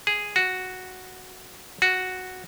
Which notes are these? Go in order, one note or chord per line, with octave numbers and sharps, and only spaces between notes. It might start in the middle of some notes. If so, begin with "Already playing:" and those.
G#4
F#4
F#4